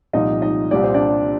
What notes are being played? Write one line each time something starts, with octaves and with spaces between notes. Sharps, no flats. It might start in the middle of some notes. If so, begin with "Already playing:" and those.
C2 A#2 F3 D#4 D#5
D#4 D#5
C2 A#2 G3 D5
C5
D4 D5